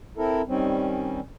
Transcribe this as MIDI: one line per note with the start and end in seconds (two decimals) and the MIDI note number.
0.17 0.42 60
0.17 0.42 64
0.17 0.42 69
0.17 0.42 70
0.48 1.20 51
0.48 1.20 55
0.48 1.20 60
0.48 1.20 61